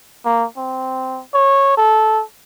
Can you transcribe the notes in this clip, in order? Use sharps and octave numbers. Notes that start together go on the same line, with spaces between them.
A#3
C4
C#5
A4